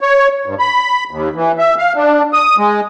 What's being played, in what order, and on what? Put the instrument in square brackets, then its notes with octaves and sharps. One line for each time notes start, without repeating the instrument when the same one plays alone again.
[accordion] C#5
G2
B5
D#2
E3
E5
F5
D4
D#6
G#3